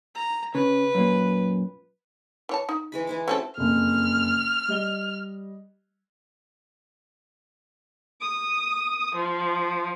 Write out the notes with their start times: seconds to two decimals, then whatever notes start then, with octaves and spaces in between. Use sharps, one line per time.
0.15 A#5
0.55 C#3 B4
0.95 F#2 A#2
2.49 E3 C#5 A5
2.69 D#4
2.92 E3 G#3 B5
3.07 E3 E4 D6
3.28 A3 C4 C#4 F#4 A4
3.57 F#1 F2 F6
4.68 G3 D#5 G7
8.22 D#6
9.15 F3